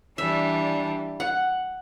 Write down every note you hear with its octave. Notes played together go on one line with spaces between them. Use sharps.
E3 G3 D4 E5
F#5